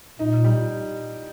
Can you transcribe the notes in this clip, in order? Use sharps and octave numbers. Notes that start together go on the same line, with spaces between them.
A#2 D#4
G3